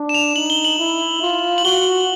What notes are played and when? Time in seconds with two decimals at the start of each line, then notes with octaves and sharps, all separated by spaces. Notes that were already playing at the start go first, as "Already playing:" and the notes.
Already playing: D4
0.09 E7
0.14 F7
0.36 D#4 F#7
0.50 G7
0.65 F#7
0.79 E4
1.22 F4
1.58 F#7
1.65 F#4 G7